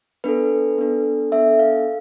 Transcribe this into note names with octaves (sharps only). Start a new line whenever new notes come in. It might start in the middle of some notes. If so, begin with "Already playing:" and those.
B3 D4 A4 B4
B3 D4 A4
B3 D4 A4 E5
F5